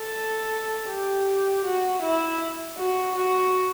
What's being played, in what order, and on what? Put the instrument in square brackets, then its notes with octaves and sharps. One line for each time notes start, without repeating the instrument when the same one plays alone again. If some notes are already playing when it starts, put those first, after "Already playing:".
Already playing: [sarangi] A4
G4
F#4
E4
F#4
F#4